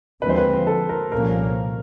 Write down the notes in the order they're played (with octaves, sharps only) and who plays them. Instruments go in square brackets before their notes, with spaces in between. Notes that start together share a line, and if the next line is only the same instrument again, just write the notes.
[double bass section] D#2 D3 F3 G#3 C4 [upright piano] B4
[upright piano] C5
B4
A4
A#4
[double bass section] C2 A#2 F3 A#3 C#4 [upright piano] A#4